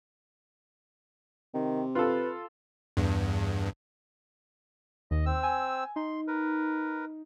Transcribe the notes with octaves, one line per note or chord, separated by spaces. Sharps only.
C3 D#3
F4 A4 B4
E2 G2
D#2 D#5
C4 E6
G#5
D#4 C6
A#4 B4